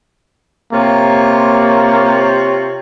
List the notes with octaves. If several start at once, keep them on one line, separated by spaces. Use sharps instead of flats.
C3 A#3 F4 C#5